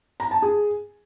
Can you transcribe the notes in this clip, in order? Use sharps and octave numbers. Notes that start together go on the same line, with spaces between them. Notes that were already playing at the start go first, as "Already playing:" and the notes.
A#5
A5
G#4